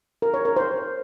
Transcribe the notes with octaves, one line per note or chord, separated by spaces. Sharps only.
A#4
C#5
A#4
C5